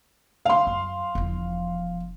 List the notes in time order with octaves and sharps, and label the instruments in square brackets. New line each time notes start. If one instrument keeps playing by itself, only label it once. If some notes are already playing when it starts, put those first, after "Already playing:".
[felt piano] F5 C6
[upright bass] F#2
E1 F3